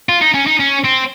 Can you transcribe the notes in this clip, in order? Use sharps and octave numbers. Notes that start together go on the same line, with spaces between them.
F4
D#4
C#4
D#4
C#4
C4